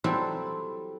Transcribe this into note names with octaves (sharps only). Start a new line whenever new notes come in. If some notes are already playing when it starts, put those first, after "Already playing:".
F#3 G3 C4 E4 A4